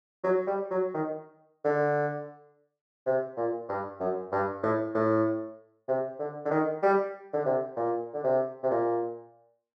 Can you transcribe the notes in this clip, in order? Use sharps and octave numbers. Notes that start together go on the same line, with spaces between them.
F#3
G3
F#3
D#3
D3
C3
A#2
G2
F#2
G2
A2
A2
C3
D3
D3
D#3
G3
D3
C3
A#2
D3
C3
C3
A#2